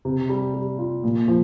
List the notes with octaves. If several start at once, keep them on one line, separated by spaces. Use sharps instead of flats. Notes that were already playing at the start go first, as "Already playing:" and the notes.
C3
G3
G3
F4
A#2
F3